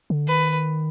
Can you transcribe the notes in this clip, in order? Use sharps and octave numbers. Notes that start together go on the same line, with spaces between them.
D3
D#3 B4